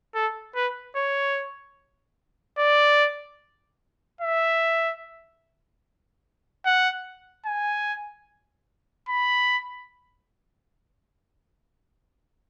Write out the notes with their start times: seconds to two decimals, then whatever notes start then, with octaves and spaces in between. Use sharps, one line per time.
0.15 A4
0.55 B4
0.96 C#5
2.58 D5
4.21 E5
6.65 F#5
7.46 G#5
9.09 B5